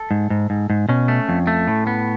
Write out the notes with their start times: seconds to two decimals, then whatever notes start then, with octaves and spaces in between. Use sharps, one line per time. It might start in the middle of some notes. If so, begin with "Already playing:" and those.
Already playing: A4
0.11 G#2
0.30 G#2
0.50 G#2
0.70 G#2
0.89 B2 C#4
1.08 A3
1.29 F2
1.47 A3
1.68 A2
1.87 B3